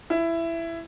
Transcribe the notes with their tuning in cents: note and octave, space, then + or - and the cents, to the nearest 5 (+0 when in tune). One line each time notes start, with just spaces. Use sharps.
E4 +15